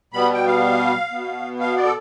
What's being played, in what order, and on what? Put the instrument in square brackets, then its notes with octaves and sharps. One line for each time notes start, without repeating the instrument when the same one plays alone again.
[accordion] B2 G3 B3 B5
G5
F5
B2 B3
F5
D5
A4